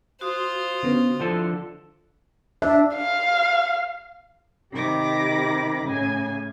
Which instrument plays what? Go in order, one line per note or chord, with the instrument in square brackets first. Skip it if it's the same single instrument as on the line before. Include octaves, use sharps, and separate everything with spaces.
[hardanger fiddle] F4 C5 [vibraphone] F#4 D#6
[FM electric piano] D3 B3 C#4
[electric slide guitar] D3 F3 A4 [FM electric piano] E4
[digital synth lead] D4 [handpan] E5
[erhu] F5
[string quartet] C3 D#3 G4 B5 D6 A#6
A2 C#3 G#5